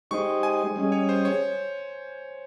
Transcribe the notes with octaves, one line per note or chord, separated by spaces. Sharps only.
G#3 D#4 G4 C5 D#5 C#6
G#5
G3 C#4 G#4 D#5
C#5
C5
C#5